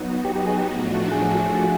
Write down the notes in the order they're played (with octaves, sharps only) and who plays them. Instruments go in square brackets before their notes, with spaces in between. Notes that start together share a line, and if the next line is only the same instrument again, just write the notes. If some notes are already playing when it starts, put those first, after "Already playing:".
Already playing: [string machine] F#3 B3 D#4 F#4
[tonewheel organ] G4
G4
G#4
G4
[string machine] A2 F3 A3 D4 F#4
[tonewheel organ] G#4